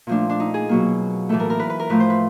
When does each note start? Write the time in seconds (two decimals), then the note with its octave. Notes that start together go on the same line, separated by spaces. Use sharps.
0.07 A#2 F3 A3 D4
0.29 D4
0.40 D#4
0.54 G#4
0.69 B2 F#3 A#3
1.29 A2 E3 A3 A4
1.40 A#4
1.50 A#4
1.59 B4
1.70 B4
1.80 A#4
1.90 A2 F3 A3 B4
2.00 C5
2.10 B4